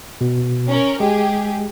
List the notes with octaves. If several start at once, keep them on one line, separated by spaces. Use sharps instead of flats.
B2
C#4 A#4
G#3 G4 G#4